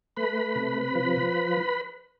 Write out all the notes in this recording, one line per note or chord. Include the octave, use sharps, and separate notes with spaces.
A3 B4 B5
C3
F3